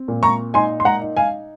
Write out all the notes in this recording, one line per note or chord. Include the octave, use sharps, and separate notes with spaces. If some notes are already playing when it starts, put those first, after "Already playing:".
Already playing: C4
A#2
A#5 C#6
D#4 G#5 C6
C6
F#5 A#5
D#4
F5 G#5